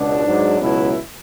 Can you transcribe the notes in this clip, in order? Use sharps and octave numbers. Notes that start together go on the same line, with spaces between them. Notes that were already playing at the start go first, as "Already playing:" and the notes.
Already playing: C#2 B2 D4
G#2 F#3
C#2 B2 F#3 E4